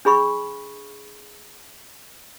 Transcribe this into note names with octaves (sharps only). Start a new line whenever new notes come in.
D4 G#4 B5 C#6